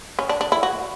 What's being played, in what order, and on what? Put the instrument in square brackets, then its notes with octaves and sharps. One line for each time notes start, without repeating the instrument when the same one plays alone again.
[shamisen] C#4
D4
D4
E4
F#4